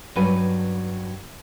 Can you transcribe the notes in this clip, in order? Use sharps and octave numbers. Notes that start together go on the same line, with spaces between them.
G2 F#3 C#4 B4 G#5